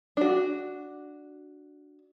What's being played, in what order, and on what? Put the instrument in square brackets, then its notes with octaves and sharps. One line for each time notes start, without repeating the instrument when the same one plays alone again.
[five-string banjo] D4 F#4